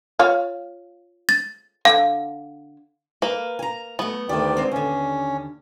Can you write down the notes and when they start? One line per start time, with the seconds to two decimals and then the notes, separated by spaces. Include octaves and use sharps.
0.19 F4 C#5 F5
1.29 A6
1.85 D3 F5
3.22 A#3 B4
3.59 G#5 A#5
3.99 F#3 A3 B3
4.29 D2 D#3 A3 G4 D5
4.57 G#3 C4
4.72 D#2 D3 C#4